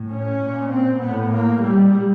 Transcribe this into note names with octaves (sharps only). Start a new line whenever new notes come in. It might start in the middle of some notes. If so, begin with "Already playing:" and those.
Already playing: A2
C#4
A#2
C4
A2 B3
A#3
A#2 G3